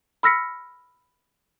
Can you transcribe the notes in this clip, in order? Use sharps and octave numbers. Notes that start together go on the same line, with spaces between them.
B5 E6 F6 A#6 B6 C#7